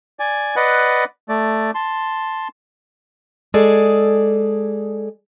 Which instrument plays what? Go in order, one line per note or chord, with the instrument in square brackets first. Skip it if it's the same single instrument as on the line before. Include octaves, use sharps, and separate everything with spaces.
[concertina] D5 G#5
B4 D5 D#5 F#5
A3 D5
A5 C6
[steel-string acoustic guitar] G#3 G#4 A4 D5